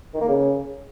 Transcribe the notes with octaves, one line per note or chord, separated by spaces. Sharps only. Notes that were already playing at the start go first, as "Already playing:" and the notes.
D#3
A#3
C#3